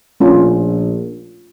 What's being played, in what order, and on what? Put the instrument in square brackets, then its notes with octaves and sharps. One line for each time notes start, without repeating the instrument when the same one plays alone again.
[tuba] A#1 [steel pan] A3 C#4 F4